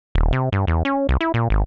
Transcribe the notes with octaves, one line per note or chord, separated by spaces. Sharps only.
D#1
C3
G2
E2
C#4
C2
E4
A#2
G#1